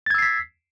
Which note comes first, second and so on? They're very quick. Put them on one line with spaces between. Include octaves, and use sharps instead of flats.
A6 G#6 E6 C7 B6